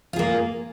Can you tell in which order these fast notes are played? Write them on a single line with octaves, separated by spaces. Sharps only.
F4 G#4 A#3